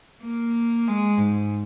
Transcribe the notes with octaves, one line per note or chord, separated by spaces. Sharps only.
A#3
G#3
G#2